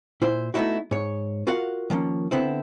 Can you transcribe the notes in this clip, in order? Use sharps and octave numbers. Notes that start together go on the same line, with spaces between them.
A#2 E4 C5
A3 B3 C4 D#4 E4 F#4
G#2 C#5
F4 F#4 A#4 F5 F#5
D#3 F3 A#3 C#4
D3 B3 C4 E4